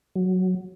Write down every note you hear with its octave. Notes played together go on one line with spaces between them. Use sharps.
F#3